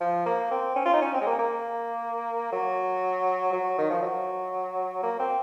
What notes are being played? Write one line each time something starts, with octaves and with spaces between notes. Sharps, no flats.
F3
A#3
C4
C#4
F4
D#4
C#4
C4
G#3
A#3
A#3
F#3
F#3
D#3
F3
F#3
A#3
C4